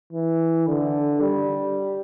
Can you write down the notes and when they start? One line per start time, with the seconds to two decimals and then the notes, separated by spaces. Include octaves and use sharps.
0.13 E3
0.67 D3
1.20 G3